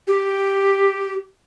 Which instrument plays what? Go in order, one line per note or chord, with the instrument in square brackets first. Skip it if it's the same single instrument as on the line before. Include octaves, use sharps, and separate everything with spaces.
[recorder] G4